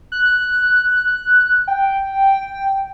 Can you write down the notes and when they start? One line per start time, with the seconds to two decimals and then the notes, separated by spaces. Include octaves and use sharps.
0.12 F#6
1.68 G5